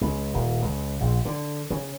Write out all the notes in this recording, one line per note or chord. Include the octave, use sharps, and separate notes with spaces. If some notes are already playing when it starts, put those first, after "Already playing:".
C#2
D#1
C#2
A#1
D3
C#3